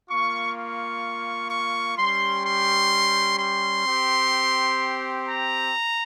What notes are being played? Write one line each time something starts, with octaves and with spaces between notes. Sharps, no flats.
A#3 F4 C#6
C#6
C#6
G3 C#4 G4 C6
C6
C6
C4 G4
A#5